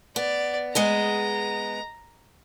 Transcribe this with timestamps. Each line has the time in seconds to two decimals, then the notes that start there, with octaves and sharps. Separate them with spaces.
0.16 B3 D5
0.75 G#3 B3 G#4 A#5